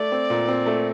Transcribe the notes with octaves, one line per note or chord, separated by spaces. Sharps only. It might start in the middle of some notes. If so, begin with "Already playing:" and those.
Already playing: A3 D5
C4
A#2
C4
A3